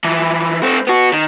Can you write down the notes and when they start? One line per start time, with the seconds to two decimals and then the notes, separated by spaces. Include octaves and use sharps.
0.04 E3 F3
0.62 A3 C4
0.87 B3 F#4
1.13 D#3